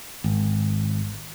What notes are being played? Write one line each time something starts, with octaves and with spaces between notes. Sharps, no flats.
G#1